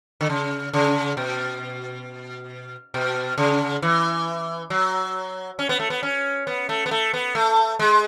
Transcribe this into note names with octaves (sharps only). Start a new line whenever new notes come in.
D3
C#3
C#3
B2
B2
C#3
E3
F#3
C#4
B3
A3
B3
C#4
B3
A3
B3
A3
B3
A3
G#3